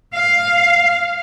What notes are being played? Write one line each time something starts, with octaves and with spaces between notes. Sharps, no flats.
F5